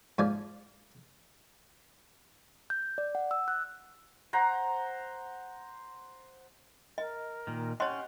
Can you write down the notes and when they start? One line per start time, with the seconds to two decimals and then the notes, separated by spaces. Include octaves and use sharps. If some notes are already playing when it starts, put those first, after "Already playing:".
0.18 G#2 F3 D5 G#5
2.70 G6
2.98 D5
3.15 F#5
3.31 E6
3.48 F#6
4.33 C5 F#5 A#5
6.98 A#4 D#5
7.47 A#2 D#3
7.80 C#4 G4 C#5 D#5 F#5 C6 F#6